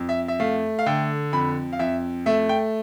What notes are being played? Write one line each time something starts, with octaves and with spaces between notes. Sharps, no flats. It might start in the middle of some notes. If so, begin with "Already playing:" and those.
Already playing: F2
E5
E5
A3 F5
F5
D3 G5
F2 B5
F5
F2 E5
A3 E5
G5